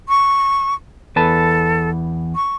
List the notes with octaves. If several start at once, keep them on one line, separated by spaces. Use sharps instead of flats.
C#6
E2 A4 B4 A5
C#6